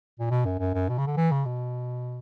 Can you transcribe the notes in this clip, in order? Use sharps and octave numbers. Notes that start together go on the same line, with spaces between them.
A#2
B2
F#2
F#2
F#2
B2
C#3
D3
E3
C#3
B2